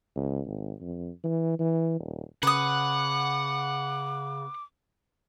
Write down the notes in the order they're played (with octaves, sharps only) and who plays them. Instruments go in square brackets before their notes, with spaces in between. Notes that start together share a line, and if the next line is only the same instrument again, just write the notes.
[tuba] C#2
G#1
F2
E3
E3
D#1
[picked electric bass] C#3 [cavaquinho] B4 D#6 [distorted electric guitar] F#5 [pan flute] D6